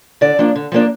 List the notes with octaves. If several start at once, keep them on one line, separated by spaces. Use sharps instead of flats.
D3 D5
F3 A#3 D4
D3
F3 A#3 D4